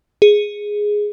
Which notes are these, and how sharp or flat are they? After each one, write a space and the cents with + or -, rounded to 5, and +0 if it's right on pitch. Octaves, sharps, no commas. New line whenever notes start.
G#4 +0